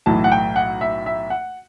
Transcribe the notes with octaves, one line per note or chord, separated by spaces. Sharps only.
B1 A2 E3 A5
F#5
G5
F#5
E5
E5
F#5